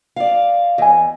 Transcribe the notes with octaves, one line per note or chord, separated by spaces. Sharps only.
D5 F5
E2 D#5 G#5